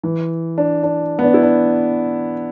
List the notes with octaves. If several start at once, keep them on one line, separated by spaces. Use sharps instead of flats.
E3
D4
D4
B3
D4
E4
D4